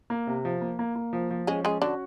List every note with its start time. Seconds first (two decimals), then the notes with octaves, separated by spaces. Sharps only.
0.10 A#3
0.27 C3
0.45 F3
0.61 A#3
0.79 A#3
0.96 A#3
1.13 F3
1.31 F3
1.47 G#3 C#4 G#4
1.64 G#3 C#4 G#4
1.82 D3 D4 F#4